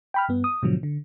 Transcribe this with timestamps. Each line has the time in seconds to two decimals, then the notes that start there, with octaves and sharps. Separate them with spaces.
0.14 G5 B5 F6
0.28 G2 B3
0.44 D#6
0.62 G#2 B2 D3 F3 F#3
0.83 D3